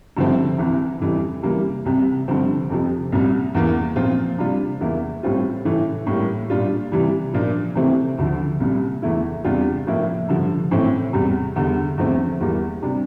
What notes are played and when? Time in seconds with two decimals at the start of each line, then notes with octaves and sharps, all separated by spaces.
0.17 G2 D3 F3 C4 E4
0.58 C2 C3 E3
1.00 F2 E3 G3
1.43 C3 E3 G3 A#3
1.85 C2 C3 G3
2.28 G2 D3 F3 C4
2.70 F2 C3 F3
3.12 C2 A#2 G3
3.54 E2 E3 A#3
3.96 A#2 F3 C4 F4
4.38 C3 G3 D4 F4
4.81 E2 E3 A#3 E4
5.23 A2 G3 C4 F4
5.65 A2 E3 A3
6.07 A2 G3 A#3
6.50 A#2 G3 D4 F4
6.92 C3 E3 G3
7.33 A#2 F3 A#3 D4
7.75 C3 E3 A3 C4
8.18 D2 D3 F3
8.60 C2 A#2 G3
9.02 E2 E3 A3 E4
9.44 E2 C3 G3 D4 F4
9.87 A2 F3 A#3 E4
10.29 G2 D3 F3
10.71 A2 E3 A3 C4
11.13 E2 C3 G3
11.56 E2 D3 G3
11.98 E2 D3 F3 A3 C4
12.40 E2 E3 G3 A#3
12.83 C3 G3 D4